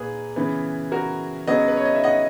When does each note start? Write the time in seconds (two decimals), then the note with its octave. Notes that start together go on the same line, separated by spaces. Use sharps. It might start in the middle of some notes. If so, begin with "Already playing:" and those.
Already playing: A#2 A#3 G#4 B4
0.36 C#3 E3 B3
0.92 F#4 A#4
1.47 C#3 F#3 B3 D#5 F#5
1.68 B4
1.77 C#5
1.85 D#5
1.95 E5
2.04 D#5 F#5